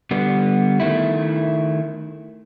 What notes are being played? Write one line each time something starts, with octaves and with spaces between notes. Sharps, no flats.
D3 G3 B3
D#3 A3 E4